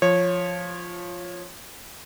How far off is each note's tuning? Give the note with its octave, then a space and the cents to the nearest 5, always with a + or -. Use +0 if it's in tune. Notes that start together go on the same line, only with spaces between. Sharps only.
F3 +0 C#5 -15